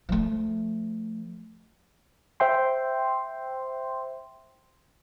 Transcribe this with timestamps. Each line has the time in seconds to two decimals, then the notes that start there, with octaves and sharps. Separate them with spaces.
0.09 F3 A3
2.40 C5 E5 G5 C6